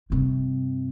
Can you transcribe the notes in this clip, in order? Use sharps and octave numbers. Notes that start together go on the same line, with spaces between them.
G2 C3